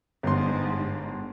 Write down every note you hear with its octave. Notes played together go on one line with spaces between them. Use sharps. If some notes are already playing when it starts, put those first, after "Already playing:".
G1 G#2 C6